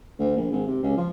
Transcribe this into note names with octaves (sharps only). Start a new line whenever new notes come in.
D2
A#1
G#1
C3
C#2
F3